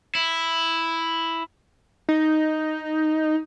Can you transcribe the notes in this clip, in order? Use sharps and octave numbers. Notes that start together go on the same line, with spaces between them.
E4
D#4